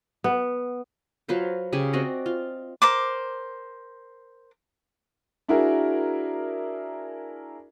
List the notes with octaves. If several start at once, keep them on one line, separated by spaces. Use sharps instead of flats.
B3
F#3 F4 B4 C5
C#3 G4 G#5 B5
C4 F#4 D5 D#5
F4
A#4 C5 D6
D4 E4 F#4 G#4 A#4